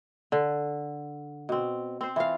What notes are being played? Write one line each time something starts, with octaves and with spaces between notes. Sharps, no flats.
D3
B2 C4
C4 C5
E3 F4 F5